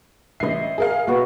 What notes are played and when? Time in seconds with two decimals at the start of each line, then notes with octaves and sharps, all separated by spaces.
0.40 A1 D#5 E5 C7
0.78 G#4 A#4 F5
1.07 B1 B3 F#4 A#5